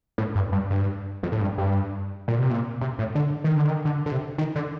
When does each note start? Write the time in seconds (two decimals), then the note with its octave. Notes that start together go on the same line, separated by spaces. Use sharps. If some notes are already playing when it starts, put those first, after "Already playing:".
0.18 A2
0.35 G2
0.52 G2
0.70 G2
1.23 F2
1.32 A2
1.41 G2
1.58 G2
2.28 A#2
2.39 C3
2.51 A#2
2.81 C3
2.99 A2
3.15 D3
3.44 D#3
3.56 D3
3.67 D#3
3.85 D3
4.06 D3
4.12 C3
4.38 D#3
4.55 D3